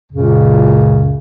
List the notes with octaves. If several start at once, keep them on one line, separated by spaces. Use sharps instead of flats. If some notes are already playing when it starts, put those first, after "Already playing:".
C#2 F#2 A#2 C#3